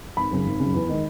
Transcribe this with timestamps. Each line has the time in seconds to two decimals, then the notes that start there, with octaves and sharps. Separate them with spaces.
0.17 G#1 B5
0.31 F#2 C#3
0.46 G#1
0.60 C#3
0.65 F#2
0.74 E2
0.89 D#3 G#3